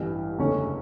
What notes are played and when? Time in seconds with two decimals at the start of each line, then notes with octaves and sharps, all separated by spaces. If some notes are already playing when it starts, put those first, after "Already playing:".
Already playing: A1 G2 E3
0.38 F#1 E2 D3 A3 C#4